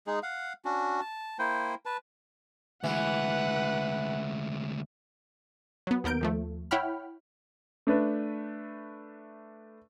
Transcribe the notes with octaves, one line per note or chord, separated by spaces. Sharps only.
G#3 D#4 G#4
F5 F#5
C#4 D4 F#4
A5
A#3 E4 C5 G5
B4 A5
D2 E3 G#3 B4 F#5
F#3 B3
D#2 B3 A#4 G6 D7
D#2 F3 A3
E4 C#5 F#5 G5 B5 F6
A3 D4 B4